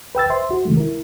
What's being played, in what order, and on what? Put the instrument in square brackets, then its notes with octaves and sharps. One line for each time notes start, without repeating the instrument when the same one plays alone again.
[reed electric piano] B4 G5 E6 A6
C5 E5 C6
F#4
C3 D#3 E3 G#3 A3
E4 A#4